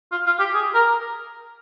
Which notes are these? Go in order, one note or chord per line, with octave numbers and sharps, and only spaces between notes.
F4
F4
G4
G#4
A#4